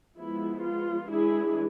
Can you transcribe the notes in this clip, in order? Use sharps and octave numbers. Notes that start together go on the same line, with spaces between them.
F3 G#3 B3 E4
F4
E3 G#3 D4 E4 G#4